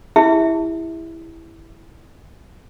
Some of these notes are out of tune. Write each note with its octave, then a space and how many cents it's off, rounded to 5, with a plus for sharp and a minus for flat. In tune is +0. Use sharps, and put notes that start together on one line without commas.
E4 +0 G4 +40 E5 -20